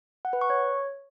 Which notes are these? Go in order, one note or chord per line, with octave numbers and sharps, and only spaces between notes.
F#5
B4
C#6
C#5